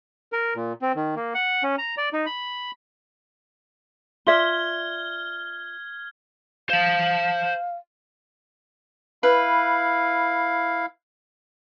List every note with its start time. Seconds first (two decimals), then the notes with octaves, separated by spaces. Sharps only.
0.32 A#4
0.55 A#2
0.82 C4
0.96 D#3
1.16 A#3
1.35 F#5
1.63 C#4
1.78 A#5
1.97 D5
2.13 D#4
2.26 B5
4.27 F4 D5 E5 F6 G#6 G7
6.70 C5 F5 A5
9.23 E4 B4 F5